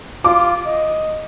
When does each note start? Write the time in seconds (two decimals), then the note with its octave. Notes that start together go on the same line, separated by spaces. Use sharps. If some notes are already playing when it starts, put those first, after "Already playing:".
0.24 F4 D6
0.66 D#5